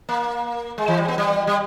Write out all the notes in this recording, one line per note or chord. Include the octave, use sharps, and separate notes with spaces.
A#3
G#3
E3
G3
B3
G3
G3